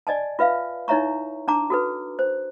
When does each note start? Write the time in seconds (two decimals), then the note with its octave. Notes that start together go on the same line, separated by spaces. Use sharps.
0.07 D5 D#5 G#5 A5
0.39 F4 B4 E5 F5
0.88 D#4 E4 C#5 E5 A#5 C#6
1.48 D4 A5 A#5 D6
1.70 F#4 A4 B4
2.19 C5